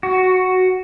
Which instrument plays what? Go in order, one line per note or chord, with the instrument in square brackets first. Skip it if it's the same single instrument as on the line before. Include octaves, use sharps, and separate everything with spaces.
[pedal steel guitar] F#4